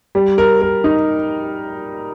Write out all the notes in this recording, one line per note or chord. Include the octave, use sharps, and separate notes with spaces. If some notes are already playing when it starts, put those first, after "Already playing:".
G3
A#4
A#4
D#4